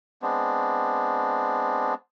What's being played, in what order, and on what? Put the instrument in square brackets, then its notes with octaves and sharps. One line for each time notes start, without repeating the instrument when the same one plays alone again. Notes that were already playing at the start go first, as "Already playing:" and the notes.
[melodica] G#3 B3 C4 D4